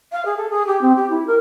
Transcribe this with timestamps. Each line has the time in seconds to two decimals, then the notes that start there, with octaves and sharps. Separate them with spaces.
0.12 F5
0.25 G#4
0.37 A4
0.50 G#4
0.67 G4
0.81 C4
0.96 G4
1.09 E4
1.27 A#4